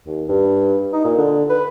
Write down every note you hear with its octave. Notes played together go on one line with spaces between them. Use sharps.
D#2
G2
D#4
A#2
D3
B4